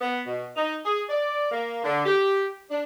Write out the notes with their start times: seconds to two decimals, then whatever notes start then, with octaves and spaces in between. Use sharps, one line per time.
0.01 B3
0.26 B2
0.56 D#4
0.85 G#4
1.09 D5
1.51 A#3
1.84 D3
2.05 G4
2.70 D4